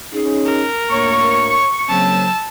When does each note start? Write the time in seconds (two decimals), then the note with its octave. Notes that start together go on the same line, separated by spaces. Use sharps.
0.13 C#4 D#4 G#4
0.46 A#4
0.91 D2 A2 A#3 C#5 C#6
1.89 C#3 F#3 A#3 C4 A5 E6